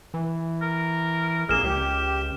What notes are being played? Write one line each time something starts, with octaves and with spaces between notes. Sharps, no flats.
E3
A#4
A#1 F2 A#3 G#4 F6 E7
C#2 G4